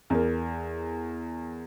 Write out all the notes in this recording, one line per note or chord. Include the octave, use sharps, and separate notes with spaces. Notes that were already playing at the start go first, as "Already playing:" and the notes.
E2 A#4